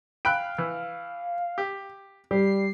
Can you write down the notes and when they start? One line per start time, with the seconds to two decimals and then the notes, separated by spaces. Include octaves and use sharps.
0.25 F5 G5 B5 F#6 D7
0.58 E3
1.58 G4
2.31 G3 G4 C7